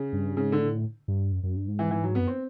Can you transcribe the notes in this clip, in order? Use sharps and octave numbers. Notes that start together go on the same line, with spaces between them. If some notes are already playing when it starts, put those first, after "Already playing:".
Already playing: C#3
G2
G#2 C#3
D3
A2
G2
F#2
F#2
G2
G#2
E3
E3
F#3
F#2 B3
C4